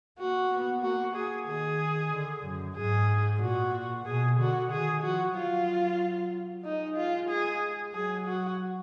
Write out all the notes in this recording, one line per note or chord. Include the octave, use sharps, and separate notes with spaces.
A#3 F#4
B3
A#3 F#4
G#4
D#3 G#4
D3
F#2
G#2 G#4
A#2 F#4
B2 G#4
D3 F#4
D#3 G#4
F3 F#4
F#3 F4
G#3 D#4
F4
G#4
F#3 G#4
F#4